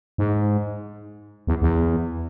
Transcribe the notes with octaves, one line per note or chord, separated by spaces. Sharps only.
G#2
E2
E2